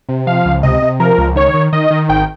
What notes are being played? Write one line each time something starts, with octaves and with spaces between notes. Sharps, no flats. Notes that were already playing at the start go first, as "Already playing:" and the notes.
C3
F3 F5
C#2
C3 D#5
C3
F3 A#4
C#2
D#3 C#5
D#3
D#3 D#5
D#3
G#1 G5